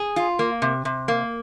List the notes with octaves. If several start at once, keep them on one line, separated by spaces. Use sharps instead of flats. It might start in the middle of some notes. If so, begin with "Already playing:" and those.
Already playing: G#4
F4
A#3
C3
C3
A#3